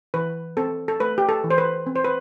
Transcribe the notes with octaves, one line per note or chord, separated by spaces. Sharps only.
E3 B4
C4 A4
A4
A3 B4
G4
A4
E3
C5
B4
C4
C5
B4